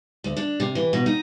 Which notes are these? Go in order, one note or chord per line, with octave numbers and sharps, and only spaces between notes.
D2
D4
C3
E3
B2
D#4